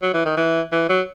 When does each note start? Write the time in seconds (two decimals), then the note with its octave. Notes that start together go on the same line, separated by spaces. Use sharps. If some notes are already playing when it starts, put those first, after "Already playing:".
0.02 F#3
0.13 E3
0.25 D#3
0.37 E3
0.72 E3
0.89 F#3